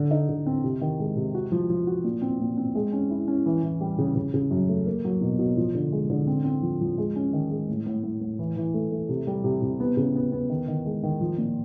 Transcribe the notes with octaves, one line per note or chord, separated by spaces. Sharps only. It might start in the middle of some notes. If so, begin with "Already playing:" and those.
Already playing: D3
D#4
D3
C4
C3
D#3
G#3
C3
F#4
F3
F3
F#4
A#2
C4
A#2
C4
G#3
C#4
E4
C#4
E3
E3
G3
C#3
C#3
C#3
F#2
A3
A#3
F#3
B2
B2
F3
D3
G#3
D3
C4
C4
F3
F3
G#3
C#4
D#3
G#3
A2
A2
A2
A2
E3
E3
A3
A3
C3
G3
C3
C3
B3
C#3
B3
B3
D#3
D#3
G#3
D#3
F3
A#2